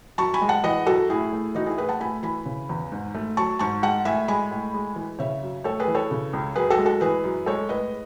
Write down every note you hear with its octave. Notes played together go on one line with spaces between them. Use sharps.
F#2 A5 C#6
G#5 B5
G#3
F#5 A5
E3 D#5 F#5
F#2 F#4 A4
A2 E4 G#4
A3
E3 D#4 F#4
E4 G#4
A2 G#4 B4
F#5 A5
A3 G#5 B5
E3 G#5 B5
C#3
E2
G#2
A3
F#3 A5 C#6
G#2 A5 C#6
G#3 F#5 A5
A2 E5 G#5
G#3 G#5 B5
A2
G#3
E3
C#3 C#5 E5
F#2
A3 A4 C#5
G#4 B4
E3
A4 C#5
C#3
C#2
F#2 G#4 B4
F#4 A4
G#3
F#4 A4
E3 G#4 B4
F#2
G#3 A4 C#5
A2 B4 D#5